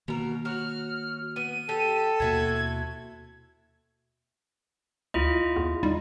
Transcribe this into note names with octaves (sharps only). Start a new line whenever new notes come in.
B2 D#3 A#3 A#4
F#4 C#5 F6
B3 D#7
G4 A4
D#2 B2 A#3 C4 E4 F#4 G#6
D2 E4 F4 D#5
E2
G3 D#4